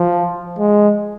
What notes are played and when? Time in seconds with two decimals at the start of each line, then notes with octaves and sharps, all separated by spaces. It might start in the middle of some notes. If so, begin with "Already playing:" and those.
Already playing: F3
0.59 G#3